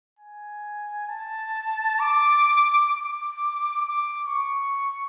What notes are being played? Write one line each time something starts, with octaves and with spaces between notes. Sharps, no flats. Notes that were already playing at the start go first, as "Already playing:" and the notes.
G#5
A5
D6
D6
D6
C#6